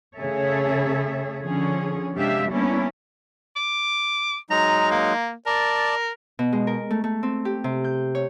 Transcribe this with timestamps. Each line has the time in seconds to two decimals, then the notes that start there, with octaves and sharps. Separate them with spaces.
0.18 C#3 A3 G#4 A4 C#5 E5
1.42 D3 F3 C#4 G#4
2.15 C3 G#3 D4 G4 E5 F5
2.52 G3 A#3 B3 C#4 D4 E4
3.56 D6
4.50 F#3 G#3 D#4 A#5
4.91 A#3
5.46 A#4 D5 A5
6.39 B2
6.53 G#3
6.67 A#4
6.91 A3
7.04 A3
7.23 C4
7.45 G4
7.64 C3
7.84 G6
8.15 C#5